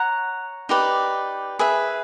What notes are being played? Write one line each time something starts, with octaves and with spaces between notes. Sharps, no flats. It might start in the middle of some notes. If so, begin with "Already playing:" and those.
Already playing: C#5 F#5 A#5
D#4 G4 B4 D5
G#4 B4 E5